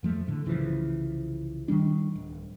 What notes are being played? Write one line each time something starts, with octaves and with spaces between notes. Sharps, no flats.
F2 F3 A3
A2 D3
C2 C#3 E3 F3
D#3 E3 G3 D4
D1